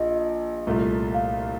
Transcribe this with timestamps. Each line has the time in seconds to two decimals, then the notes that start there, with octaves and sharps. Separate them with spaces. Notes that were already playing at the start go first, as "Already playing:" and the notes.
Already playing: A#1 D#5
0.67 C2 A#2 A3
1.14 F5